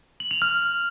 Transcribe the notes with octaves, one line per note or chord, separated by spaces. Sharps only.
F#7
F7
F6